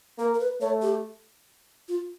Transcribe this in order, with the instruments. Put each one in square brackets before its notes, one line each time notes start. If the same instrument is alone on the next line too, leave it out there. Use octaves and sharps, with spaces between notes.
[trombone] A#3 [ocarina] A#4
[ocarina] A#4
B4
[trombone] A3 [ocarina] C#5
[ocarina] G4
F4